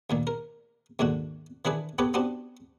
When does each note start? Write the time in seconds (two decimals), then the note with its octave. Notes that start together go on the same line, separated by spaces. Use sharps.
0.10 D2 A#2 D#3
0.27 A#4
0.99 D#2 G#2 D3 F#4
1.65 D#3 E3 D4 G#4 B4
1.98 B3 G4 A4 B4 C#5
2.14 B3 C4 D4 F#4 G4